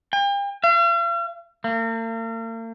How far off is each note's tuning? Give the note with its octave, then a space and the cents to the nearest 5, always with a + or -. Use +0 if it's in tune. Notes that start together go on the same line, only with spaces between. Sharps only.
G5 +40
F5 -45
A#3 -45